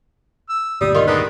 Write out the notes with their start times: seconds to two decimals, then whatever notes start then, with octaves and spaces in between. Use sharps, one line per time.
0.50 E6
0.81 G1 D2 A#2 G3 D#6
0.95 D#3 F4
1.07 G#3 B3 D4 D#4